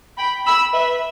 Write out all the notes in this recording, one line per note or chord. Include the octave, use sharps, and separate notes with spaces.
G5 B5
B5 E6
B4 E5